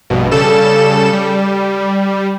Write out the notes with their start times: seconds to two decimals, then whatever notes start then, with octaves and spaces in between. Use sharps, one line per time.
0.10 A#1 G2 B2
0.31 C#3 G3 A4 E7
1.13 G3